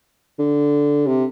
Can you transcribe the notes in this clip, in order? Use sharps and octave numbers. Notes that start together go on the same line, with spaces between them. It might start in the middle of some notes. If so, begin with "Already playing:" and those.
D3
C3